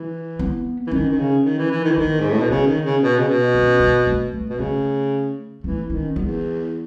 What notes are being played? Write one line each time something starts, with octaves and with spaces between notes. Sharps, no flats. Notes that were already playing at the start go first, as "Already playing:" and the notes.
Already playing: E3
B3
E3
D#3 C#4
D#3
C#3
D#3
E3
E3
D#3
E3
D#3 B3
G#2
A2
B2
C#3 B3
D#3
C#3
B2
C#3
B2
C#4
B3
A3
A3
B2
C#3 A3
E3 A3
D#3 C#4
E2 B3